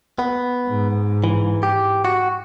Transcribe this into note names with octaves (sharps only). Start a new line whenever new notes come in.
B3
G#2
E3
G4
F#4